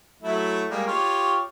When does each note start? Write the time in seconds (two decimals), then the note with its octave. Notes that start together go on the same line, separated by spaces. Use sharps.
0.22 F#3 A3 E4
0.69 G3 G#3 A#3
0.87 F4 G4 C#5